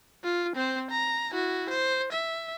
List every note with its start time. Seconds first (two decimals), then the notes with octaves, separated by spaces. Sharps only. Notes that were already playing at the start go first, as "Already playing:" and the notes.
0.24 F4
0.56 C4 C5
0.91 A#5
1.31 E4 F#4
1.70 C5
2.12 E5